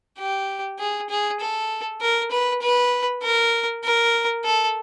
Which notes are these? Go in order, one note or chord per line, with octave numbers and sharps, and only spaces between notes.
G4
G#4
G#4
A4
A#4
B4
B4
A#4
A#4
A4